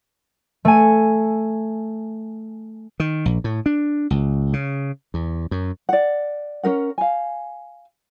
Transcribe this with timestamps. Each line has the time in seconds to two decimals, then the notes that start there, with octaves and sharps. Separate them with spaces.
0.65 A3 G#5
3.00 D#3
3.25 A#1
3.44 A2
3.66 D4
4.10 C#2
4.53 C#3
5.14 E2
5.51 F#2
5.89 D5 F#5
6.63 C#4 D4 A#4 F#5
6.98 F5 G#5